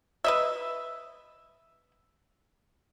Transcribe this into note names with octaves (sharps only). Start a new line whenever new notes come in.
B4 D#5 E5